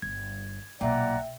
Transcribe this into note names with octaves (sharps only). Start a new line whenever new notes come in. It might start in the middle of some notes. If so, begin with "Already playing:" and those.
G1 G#6
B1 A#2 D5 E5 F#5 G5 A#5